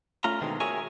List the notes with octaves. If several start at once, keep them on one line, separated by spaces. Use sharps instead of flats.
A3 C#4 F4 A#5
B2 D3 D#3 G#3 C4
F#4 G#4 A#4 C#5 E5 G#5